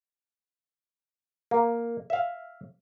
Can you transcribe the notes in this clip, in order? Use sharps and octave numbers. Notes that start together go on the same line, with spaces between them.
A#3
E5 F5